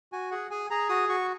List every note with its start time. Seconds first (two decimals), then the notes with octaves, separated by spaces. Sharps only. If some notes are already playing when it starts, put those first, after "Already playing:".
0.12 F#4 G#5
0.31 G#4 F#5
0.51 G#4 G#5
0.70 G#4 A#5
0.89 F#4 D#6
1.09 F#4 C#6